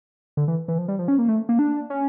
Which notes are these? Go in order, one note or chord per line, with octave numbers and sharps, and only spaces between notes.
D3
E3
E3
F3
G3
F3
C#4
A#3
A3
A#3
D4
C#4